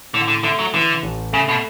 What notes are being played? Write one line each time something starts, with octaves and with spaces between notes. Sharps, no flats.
A2 D3
D3
D3 A3
F#3
D3 E3
A1
C#3 A3
B2